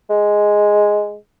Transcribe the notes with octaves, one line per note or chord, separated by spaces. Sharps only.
G#3